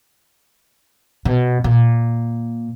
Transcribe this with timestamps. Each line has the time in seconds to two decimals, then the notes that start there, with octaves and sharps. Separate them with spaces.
1.25 B2
1.64 A#2